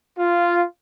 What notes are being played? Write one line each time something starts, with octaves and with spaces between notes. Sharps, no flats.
F4